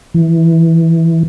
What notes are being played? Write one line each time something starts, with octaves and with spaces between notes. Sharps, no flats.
E3